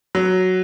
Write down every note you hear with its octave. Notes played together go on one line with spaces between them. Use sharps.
F#3